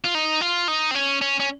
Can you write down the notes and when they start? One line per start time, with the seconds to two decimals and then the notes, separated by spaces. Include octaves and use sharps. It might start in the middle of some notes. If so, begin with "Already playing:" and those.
0.04 F4
0.15 D#4
0.41 F4
0.68 D#4
0.91 C4
0.95 C#4
1.21 C#4
1.40 C#4